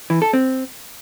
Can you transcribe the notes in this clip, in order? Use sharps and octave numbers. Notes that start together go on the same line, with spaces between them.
E3
A4
C4